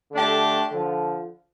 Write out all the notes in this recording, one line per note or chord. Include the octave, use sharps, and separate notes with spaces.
D3 A3 D4 G4
D3 F3